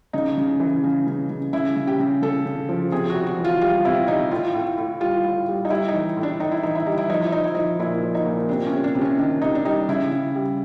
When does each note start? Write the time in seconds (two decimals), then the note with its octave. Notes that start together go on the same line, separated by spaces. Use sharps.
0.13 C#3 D#4
0.37 C#3
0.60 E3
0.84 C#3
1.07 C#3
1.30 C#3
1.53 C#3 E4
1.76 C#3
1.87 G4
1.99 C#3
2.22 C#3 A4
2.45 C#3
2.69 F3
2.92 C3 G#4
3.10 F#4
3.16 C3
3.27 F#4
3.38 E3
3.44 F4
3.61 G3 F4
3.85 C3 E4
4.08 C3 D#4
4.31 A2 F4
4.54 A2
4.78 A2
5.00 G3 F4
5.24 A2
5.48 G3
5.65 D#4
5.70 G3 E4
5.88 D#4
5.94 E3
6.17 A2
6.23 D4
6.40 A2 D#4
6.51 E4
6.63 E3 D#4
6.75 E4
6.86 G3 D#4
6.97 E4
7.10 F3 D#4
7.20 E4
7.32 F3 D#4
7.43 E4
7.55 F3 D#4
7.79 A#2 E4
8.03 F3
8.15 D#4
8.26 A#2
8.49 C3 D4
8.67 C#4
8.72 C3
8.84 D4
8.95 C3
9.01 C#4
9.18 D#3 D4
9.41 C3 D#4
9.55 D4
9.65 G3 D#4
9.88 C#3 E4
10.12 C#3
10.35 G3